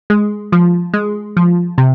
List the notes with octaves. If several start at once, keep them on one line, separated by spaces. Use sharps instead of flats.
G#3
F3
G#3
F3
C3